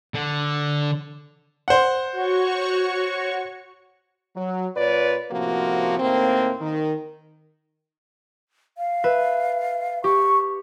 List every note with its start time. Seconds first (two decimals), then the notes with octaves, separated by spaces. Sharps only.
0.14 D3
1.68 C5 F#5
2.12 F#4 C#5 C#6
4.36 F#3
4.76 A#2 F4 B4 C#5 D5
5.31 A2 C3 F3 A#3 B3 F#4
5.99 D#2 A2 A#3 C4
6.61 D#3
8.78 F5
9.04 B4 E5
10.04 G4 C#6